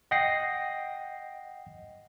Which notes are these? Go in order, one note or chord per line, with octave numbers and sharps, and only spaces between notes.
D#5 F#5 G5 A#6 C7